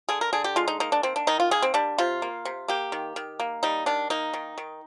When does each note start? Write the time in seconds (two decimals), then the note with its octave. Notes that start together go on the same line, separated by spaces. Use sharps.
0.09 D3 G#4
0.21 A#4
0.33 D3 G#4
0.44 G4
0.56 G#3 F4
0.68 D#4
0.80 A#3 D#4
0.92 D4
1.03 D#3 C4
1.16 D4
1.27 D#3 D#4
1.40 F4
1.51 A#3 G#4
1.62 C4
1.74 G3 D4
1.98 C3 F4
2.22 A#3
2.45 C3
2.68 A#3 G4
2.92 D#3
3.16 D#3
3.40 A#3
3.63 G3 D#4
3.86 D#3 D4
4.10 A#3 D#4
4.33 D#3
4.58 D#3